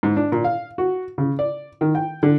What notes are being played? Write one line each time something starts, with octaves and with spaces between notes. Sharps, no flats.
G#2
D4
A#2
F5
F#4
C#3
D5
D#3
G5
D3